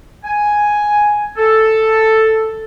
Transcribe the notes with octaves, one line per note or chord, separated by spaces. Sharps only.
G#5
A4